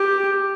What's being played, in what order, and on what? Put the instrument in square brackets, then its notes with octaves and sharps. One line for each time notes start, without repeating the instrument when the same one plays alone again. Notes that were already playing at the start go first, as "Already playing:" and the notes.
Already playing: [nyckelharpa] G4